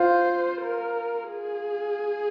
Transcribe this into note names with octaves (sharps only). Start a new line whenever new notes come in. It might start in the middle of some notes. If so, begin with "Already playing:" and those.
Already playing: F4 C5
A#4
G#4